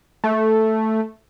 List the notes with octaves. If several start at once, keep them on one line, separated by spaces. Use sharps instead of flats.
A3